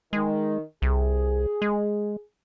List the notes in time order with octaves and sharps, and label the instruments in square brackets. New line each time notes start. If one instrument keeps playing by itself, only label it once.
[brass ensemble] D#3 [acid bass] G#3
[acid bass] C2 [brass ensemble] G#4
[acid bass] G#3